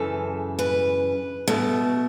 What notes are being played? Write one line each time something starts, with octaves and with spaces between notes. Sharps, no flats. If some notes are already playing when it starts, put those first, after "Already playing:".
Already playing: F#2 C#3 E3 A4
B4
B2 A3